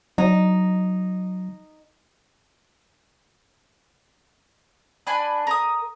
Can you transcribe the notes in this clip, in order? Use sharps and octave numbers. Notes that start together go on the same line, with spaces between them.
F#3 D#4
D4 B4 G#5
A#4 D#6